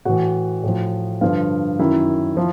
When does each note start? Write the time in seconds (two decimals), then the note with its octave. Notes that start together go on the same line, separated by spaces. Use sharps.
0.05 A2 E3 F#4 F#5
0.63 A2 F3
1.21 G2 D3 F3 F4 F5
1.79 F#2 D#3 E4 E5
2.37 F3